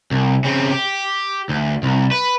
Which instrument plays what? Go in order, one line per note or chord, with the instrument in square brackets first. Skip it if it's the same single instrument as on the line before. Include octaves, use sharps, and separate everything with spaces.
[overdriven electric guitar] C2
C#3 C4
G4
D2
C2
B4